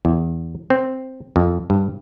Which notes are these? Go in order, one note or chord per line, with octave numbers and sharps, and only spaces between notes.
E2
C4
F2
G2